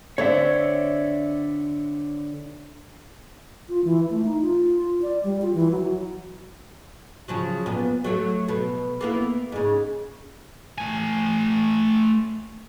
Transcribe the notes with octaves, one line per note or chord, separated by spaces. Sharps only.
D3 C4 C#5 D5 E5
F4
E3
A3
D#4
F4
D5
G3
F4
E3
F#3
C#3 F3 F#3
A#2 B3
F#3 A3
B2
A#3 B3 E4
G#2 C#3
A3 G#5